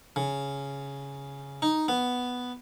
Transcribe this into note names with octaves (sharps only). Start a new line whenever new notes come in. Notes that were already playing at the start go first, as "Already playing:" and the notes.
C#3
D#4
B3